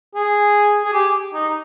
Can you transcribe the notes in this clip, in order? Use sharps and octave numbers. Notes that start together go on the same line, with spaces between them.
G#4
G#4
G4
D#4